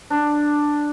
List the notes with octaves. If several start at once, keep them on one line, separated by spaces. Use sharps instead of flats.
D4